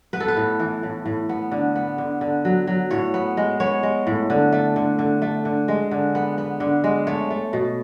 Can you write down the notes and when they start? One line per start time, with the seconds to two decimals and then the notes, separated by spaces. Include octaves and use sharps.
0.13 B3 B4
0.20 A4
0.28 B4
0.37 A2
0.60 E3
0.83 A2
1.06 A2
1.29 B3
1.52 D3
1.76 B3
1.98 D3
2.21 D3
2.45 F#3
2.67 F#3
2.91 A2 C#5
3.14 B3
3.37 G#3
3.60 B3 C#5
3.83 G#3
4.07 A2
4.30 D3
4.52 A3
4.76 D3
4.99 D3
5.22 A3
5.45 D3
5.68 G#3
5.91 D3
6.15 B3
6.38 B3
6.60 D3
6.84 G#3
7.07 A3 C#5
7.30 A3
7.53 B2